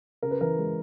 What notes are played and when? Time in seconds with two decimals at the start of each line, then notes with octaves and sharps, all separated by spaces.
0.23 C#3 A#4
0.31 B4
0.41 E3 A#4
0.58 G#3